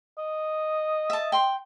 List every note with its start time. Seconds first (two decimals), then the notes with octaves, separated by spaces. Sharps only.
0.18 D#5
1.10 E5 A5
1.32 G5 C6